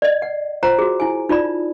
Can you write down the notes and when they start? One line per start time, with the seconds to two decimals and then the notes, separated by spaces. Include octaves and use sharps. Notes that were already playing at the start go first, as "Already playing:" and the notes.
0.02 D5 D#5
0.22 F#5
0.63 F4 C5 F#5 A#5
0.79 F#4 G#4
1.00 E4 G#5
1.29 D#4 F4 D5 B5